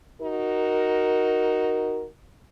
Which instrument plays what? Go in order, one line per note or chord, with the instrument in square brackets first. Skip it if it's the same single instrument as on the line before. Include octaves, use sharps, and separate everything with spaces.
[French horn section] D#4 F#4 A#4